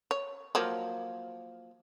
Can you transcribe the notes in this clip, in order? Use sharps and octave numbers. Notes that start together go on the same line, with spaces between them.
C#5
F3 F#3 A#3